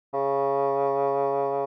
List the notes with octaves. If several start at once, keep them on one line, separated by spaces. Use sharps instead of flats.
C#3